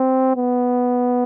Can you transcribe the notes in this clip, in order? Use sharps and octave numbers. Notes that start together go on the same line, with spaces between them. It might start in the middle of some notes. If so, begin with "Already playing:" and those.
Already playing: C4
B3